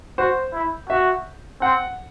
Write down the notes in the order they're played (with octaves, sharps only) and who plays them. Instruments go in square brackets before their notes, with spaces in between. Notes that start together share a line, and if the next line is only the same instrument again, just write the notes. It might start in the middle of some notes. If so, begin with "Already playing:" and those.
[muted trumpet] F#4 [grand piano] C5
[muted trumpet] E4
[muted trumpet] F#4 [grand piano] E5
[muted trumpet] C4 [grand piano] F#5